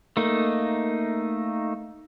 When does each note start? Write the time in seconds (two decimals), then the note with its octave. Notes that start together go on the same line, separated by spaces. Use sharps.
0.17 A3 A#3 D#4